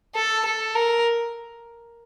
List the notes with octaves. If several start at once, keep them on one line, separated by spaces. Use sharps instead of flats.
A4
A4
A#4